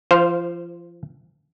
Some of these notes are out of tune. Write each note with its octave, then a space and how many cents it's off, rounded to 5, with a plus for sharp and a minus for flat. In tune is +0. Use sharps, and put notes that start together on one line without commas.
F3 -30 C5 +0 F5 +0